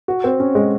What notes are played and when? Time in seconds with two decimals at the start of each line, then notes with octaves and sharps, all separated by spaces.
0.08 F#4
0.24 C4
0.40 C#4
0.55 G#3